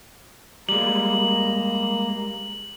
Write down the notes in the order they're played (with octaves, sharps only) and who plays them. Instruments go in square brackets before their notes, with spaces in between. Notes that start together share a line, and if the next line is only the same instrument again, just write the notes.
[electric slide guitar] G3 G#3 [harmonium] A#3 A#5 [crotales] F#7